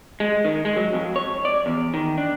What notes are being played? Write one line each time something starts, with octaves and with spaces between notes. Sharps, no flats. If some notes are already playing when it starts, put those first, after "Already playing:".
G#3
D#3
G#3
F#3
F2
C#5
D5
E2
D#3
D4